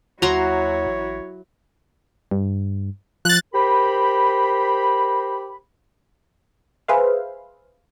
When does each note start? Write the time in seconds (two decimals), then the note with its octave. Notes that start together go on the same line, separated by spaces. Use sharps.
0.22 D#2 F#3 E4 F#4 C#5 A#5 C6
0.87 A1
2.31 G2
3.25 F3 F#6 A6
3.54 G4 A#4 C5 B5
6.88 G#4 B4 C5 E5 F5